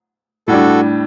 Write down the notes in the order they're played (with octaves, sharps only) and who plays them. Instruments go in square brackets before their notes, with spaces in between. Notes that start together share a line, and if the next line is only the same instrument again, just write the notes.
[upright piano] A2 G3 D4 [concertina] F#4 A4